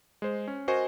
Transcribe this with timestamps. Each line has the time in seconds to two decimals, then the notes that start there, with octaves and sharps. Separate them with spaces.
0.22 G#3 C5
0.48 C#4
0.68 F#4 A#4 C5 D#5 G#5 C#6